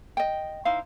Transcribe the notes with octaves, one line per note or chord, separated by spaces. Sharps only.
D#5 G5
D#4 E4 C5 F5